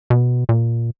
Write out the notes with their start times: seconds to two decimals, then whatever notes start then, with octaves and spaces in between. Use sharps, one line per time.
0.10 B2
0.49 A#2